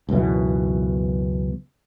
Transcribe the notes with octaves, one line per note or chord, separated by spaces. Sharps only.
C#2 F#2 B2 E3